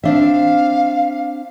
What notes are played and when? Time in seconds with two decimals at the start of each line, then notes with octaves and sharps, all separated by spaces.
0.04 C4 D4 E5 F5